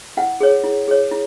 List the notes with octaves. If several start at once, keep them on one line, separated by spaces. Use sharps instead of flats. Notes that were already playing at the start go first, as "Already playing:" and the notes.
E4 F#5
G#4 C#5
E4
G#4 C#5
E4